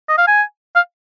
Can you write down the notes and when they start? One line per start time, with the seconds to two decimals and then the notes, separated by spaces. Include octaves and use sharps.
0.09 D#5
0.18 F5
0.28 G#5
0.76 F5